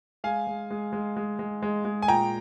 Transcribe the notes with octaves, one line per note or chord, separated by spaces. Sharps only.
G#3 F5 G#5
G#3
G#3
G#3
G#3
G#3
G#3
G#3
G#5
A#2 G5 A#5